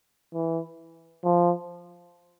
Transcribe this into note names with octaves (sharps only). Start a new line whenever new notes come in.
E3
F3